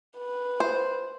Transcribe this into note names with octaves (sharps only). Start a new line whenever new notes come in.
B4
C5